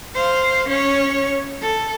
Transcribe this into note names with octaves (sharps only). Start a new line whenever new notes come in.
C5 F5
C#4 C#5
A4